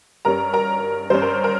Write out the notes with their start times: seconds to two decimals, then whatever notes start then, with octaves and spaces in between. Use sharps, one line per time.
0.25 G2 G3 C#4 A#4 A#5
0.53 A#4 A#5
1.10 G2 G3 C#4 C5
1.22 A#4
1.44 A#4